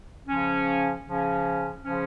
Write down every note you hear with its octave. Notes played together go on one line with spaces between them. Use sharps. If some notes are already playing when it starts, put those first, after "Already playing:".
C#3 F3 C#4
C#3 F3 C#4
C#3 F3 C#4